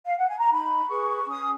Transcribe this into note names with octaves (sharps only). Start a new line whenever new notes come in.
F5
F#5
G#5
A#5
D#4 B5
G#4 B4 C#6
C#4 D#6